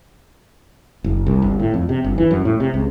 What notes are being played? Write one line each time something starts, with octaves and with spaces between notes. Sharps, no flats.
F#1
C2
G1
A2
F2
C3
G1
E3
F#2
A2
C3
C#2